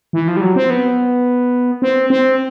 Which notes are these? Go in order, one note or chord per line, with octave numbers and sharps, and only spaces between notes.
E3
F3
G3
F#3
C4
B3
C4
C4